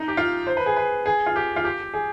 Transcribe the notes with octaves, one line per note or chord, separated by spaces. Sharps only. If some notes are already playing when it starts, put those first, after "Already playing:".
Already playing: D#4
G4
F4
C5
B4
G#4
B4
G#4
F4
G4
F4
G4
G#4